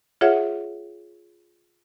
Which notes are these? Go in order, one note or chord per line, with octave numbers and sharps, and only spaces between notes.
F4 G#4 C#5 E5 F#5